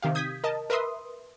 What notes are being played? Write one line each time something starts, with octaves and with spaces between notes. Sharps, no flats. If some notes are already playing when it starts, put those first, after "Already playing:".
C3 D#3 G4 F5
D#6 G6 G#6 B6
A#4 D#5 A5
A#4 B4 E5 C6 D#6